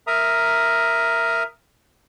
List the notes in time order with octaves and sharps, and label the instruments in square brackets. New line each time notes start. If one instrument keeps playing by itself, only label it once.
[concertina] A#4 E5 A#5 D#6